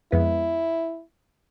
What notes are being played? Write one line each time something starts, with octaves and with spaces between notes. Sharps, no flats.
F2 G#3 B3 E4